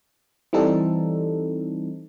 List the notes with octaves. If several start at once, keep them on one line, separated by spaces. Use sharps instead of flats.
E3 G3 C4 D#4 A4